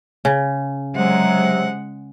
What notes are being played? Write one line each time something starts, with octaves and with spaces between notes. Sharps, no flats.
C#3
C3 F#3 G#3 F#5